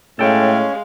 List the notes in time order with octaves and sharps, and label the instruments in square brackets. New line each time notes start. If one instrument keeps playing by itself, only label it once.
[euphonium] A2 [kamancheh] G#3 F5 [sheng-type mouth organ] C#4 [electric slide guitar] A4 G5